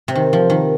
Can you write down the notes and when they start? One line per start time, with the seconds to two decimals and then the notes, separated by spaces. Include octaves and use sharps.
0.08 C3
0.15 D#3
0.33 F3
0.50 D#3